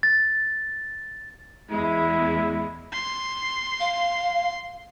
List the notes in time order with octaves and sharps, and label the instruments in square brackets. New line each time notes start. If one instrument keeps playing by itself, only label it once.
[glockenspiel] A6
[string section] E2 G#3 [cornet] E4
[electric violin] C6
[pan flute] F5